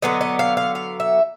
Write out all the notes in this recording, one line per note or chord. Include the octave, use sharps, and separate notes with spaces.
D3 F#3 B3 D#5
D#5
F5
F5
F5
E5